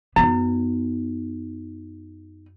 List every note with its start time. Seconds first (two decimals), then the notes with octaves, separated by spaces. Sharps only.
0.16 F#2 B3 D#4